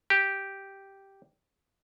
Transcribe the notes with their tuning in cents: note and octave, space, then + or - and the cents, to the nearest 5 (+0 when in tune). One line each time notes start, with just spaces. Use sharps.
G4 -5